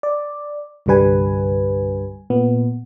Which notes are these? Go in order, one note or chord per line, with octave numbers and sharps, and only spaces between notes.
D5
C2 G2 D3 G3 B4 G#5
A#2 B3